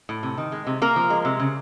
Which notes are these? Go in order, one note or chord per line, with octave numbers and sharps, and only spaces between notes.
A2
C3
D#3
G#3
C3
C3 A#3 A#4
F3
G#3
C3
C#3